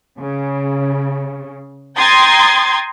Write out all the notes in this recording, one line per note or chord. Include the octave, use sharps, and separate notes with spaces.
C#3
G5 A#5 C6 D#6 G#6 A6